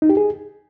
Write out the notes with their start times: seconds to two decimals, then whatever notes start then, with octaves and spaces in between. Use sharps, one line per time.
0.02 D#4
0.10 G4
0.17 G#4